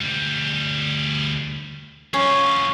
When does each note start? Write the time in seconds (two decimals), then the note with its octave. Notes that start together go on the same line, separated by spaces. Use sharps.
0.01 D2 G3
2.14 F#3 C#4 F4